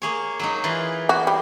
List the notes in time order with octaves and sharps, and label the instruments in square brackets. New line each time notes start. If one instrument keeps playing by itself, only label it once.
[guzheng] A#3 G#4 C#5
F#3 A#3 D#4
E3 F4 G#4
[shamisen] F#4
G3